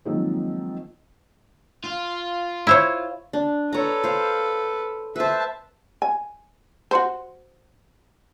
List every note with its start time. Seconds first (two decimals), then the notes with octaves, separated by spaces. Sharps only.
0.05 D#3 F3 F#3 G#3 A#3 C4
1.84 F4
2.67 E4 C5 C#5
3.33 D4
3.73 A4 B4 C#5 A#5
4.04 C5 F5
5.16 B4 C5 E5 A5
6.02 G#5
6.91 F#4 C5